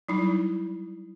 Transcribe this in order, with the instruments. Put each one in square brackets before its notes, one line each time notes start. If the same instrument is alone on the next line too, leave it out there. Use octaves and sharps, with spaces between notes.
[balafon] F#3 G3 D#4 E4